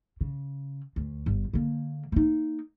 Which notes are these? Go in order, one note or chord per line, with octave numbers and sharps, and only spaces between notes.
C#3
D2
G1
D3 A#3
A#3 D#4